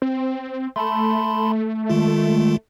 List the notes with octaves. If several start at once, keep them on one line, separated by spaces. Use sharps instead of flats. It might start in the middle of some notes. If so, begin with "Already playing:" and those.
C4
A3 A5 B5 C6
D#3 G#3 F4